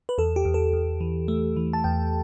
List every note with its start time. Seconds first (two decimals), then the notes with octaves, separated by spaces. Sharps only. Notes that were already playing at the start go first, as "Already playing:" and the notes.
0.09 B4
0.18 E2 A4
0.36 G4
0.45 E2
0.54 A4
0.73 E2
1.00 E3
1.28 A3
1.56 E3
1.73 A5
1.84 E2 G5